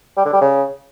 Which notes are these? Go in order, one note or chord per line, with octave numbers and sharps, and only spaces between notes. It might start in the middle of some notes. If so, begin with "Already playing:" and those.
G3
D3
G3
C#3